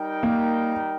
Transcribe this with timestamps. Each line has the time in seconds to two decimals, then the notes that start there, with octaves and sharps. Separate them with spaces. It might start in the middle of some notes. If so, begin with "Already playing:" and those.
Already playing: G3 D#4 A#4 G5
0.23 A#3